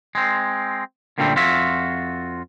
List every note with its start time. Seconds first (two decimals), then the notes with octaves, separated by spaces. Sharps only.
0.15 G#3 C4
1.18 F#2 A#2 D3 G3 A3 C4
1.36 F2 F4 F#4 E5